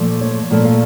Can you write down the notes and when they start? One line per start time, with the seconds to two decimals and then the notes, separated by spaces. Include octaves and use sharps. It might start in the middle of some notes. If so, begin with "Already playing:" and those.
Already playing: A#2 F3 A3
0.21 C#5
0.50 A#2 F3 A3
0.65 F5